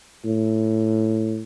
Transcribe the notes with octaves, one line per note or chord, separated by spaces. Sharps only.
A2